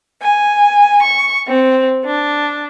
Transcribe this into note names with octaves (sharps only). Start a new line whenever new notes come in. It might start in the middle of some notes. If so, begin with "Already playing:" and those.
G#5
C#6
C4
D4